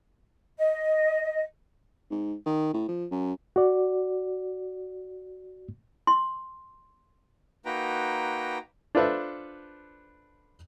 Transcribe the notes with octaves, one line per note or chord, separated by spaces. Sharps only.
D#5
G#2
D#3
A2
F3
F#2
F#4 D5
C6
A#3 D#4 F#4 B4 G5 A#5
D4 F4 A4 B4 C5 E5